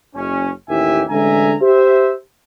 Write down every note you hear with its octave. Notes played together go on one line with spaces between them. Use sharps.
F#1 C#4
A1 D#2 E4 G4 E5 G#5
A1 D3 G#3 E5 G#5 A#5
G4 C5 E5